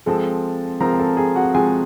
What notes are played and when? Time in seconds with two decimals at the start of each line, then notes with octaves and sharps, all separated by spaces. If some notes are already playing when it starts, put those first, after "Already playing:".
0.06 F3 G#3 C4 A4 A5
0.81 F3 G#3 C4 A#4 A#5
0.93 A#5
0.99 A4 A5
1.17 G#4 G#5
1.36 F#4 F#5
1.54 F3 G#3 C4 G#4 G#5